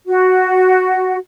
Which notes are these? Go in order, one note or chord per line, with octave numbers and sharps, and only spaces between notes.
F#4